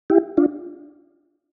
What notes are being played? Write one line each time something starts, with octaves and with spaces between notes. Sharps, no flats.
E4 G4
D4 F4